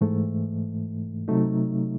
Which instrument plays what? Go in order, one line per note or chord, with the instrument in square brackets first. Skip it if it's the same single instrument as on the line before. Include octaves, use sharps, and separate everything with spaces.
[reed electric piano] G#2 E3 A3
C3 F#3 A3 D#4